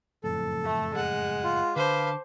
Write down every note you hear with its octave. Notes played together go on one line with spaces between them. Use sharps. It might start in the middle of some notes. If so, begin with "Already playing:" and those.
F#1 F2 A2 A4
A3
G#3 F#5
F4
D3 B4 C5 F5 A5 D6